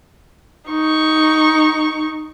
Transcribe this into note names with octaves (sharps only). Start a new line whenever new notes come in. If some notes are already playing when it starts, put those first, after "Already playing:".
D#4 C#6